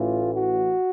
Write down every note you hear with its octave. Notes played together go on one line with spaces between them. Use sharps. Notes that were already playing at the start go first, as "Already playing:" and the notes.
Already playing: A1 A2 E3 F4
F#4